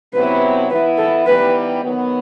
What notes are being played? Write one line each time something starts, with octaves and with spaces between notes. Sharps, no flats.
C3 F#3 B3 E4 G4 B4
E3 B3 E4 B4
A4
E3 G3 B3 D#4 G4 B4
D#3 F#3 B3